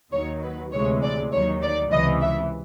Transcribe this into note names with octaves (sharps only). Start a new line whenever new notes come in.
D#2 D#3 F#3 C#5
B4
D2 C3 E3 G#3 C#5
D5
D#2 D#3 F#3 C#5
D5
C#2 C3 E3 D#5
E5